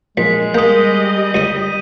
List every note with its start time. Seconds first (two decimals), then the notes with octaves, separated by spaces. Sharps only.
0.17 A#1 G#3 B6
0.54 G3 A#3 G4 D#5 D#6 G6
1.34 C#2 D#6 D#7